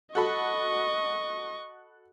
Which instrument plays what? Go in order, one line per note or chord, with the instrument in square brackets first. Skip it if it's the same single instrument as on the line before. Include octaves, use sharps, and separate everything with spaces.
[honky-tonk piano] F#4 A4 B5 [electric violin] D#5 C#6